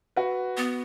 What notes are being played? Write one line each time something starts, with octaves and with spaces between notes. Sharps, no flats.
F#4 B4
B3